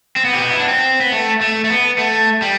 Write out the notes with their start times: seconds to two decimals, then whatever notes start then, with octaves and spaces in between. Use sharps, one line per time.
0.16 C4
0.25 B3
0.34 G4
0.43 F#4
0.51 E4
0.60 D4
0.68 C4
1.01 B3
1.12 A3
1.41 A3
1.64 A3
1.70 B3
1.98 A3
2.42 G3